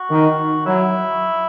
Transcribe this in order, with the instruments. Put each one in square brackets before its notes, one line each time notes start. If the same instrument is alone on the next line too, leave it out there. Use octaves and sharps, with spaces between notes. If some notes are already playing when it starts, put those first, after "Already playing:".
Already playing: [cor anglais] F#4
[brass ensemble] D#3
[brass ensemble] F#3 [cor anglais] E4